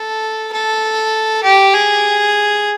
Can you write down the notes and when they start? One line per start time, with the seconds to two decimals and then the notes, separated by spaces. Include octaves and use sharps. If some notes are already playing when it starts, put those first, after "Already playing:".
Already playing: A4
0.53 A4
1.44 G4
1.74 G#4